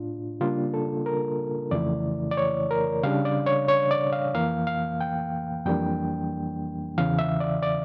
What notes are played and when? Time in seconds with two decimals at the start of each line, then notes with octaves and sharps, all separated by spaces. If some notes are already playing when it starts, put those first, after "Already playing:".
Already playing: A2 D4 F4
0.41 C#3 G3 A#3 D4 F4
0.74 A4
1.06 A#4
1.71 F2 C#3 E3 A3 E4 D5
2.31 D5
2.37 C#5
2.71 A#4
3.03 C#3 G3 D4 F5
3.25 D5
3.46 C#5
3.68 C#5
3.91 D5
4.13 F5
4.34 F2 E3 A#3 F5
4.67 F5
5.01 G5
5.66 F2 E3 G3 A#3 D4 G5
6.98 E2 C#3 E3 F5
7.19 E5
7.40 D5
7.63 D5